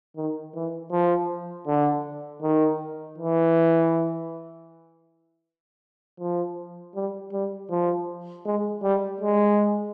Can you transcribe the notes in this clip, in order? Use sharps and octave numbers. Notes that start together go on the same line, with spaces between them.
D#3
E3
F3
D3
D#3
E3
F3
G3
G3
F3
G#3
G3
G#3